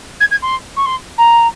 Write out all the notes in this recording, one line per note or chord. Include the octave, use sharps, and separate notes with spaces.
G#6
G#6
C6
C#6
C6
A#5